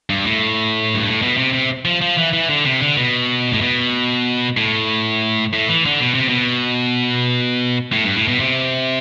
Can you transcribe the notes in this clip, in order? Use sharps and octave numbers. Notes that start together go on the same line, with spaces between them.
G2
A2
G2
A2
B2
C3
C3
F3
F3
E3
E3
D3
C3
D3
B2
A2
B2
A2
A2
E3
D3
B2
C3
B2
A2
G2
A2
B2
C3